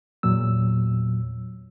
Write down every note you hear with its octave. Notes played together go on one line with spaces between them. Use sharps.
E2 A#2 F#3 E6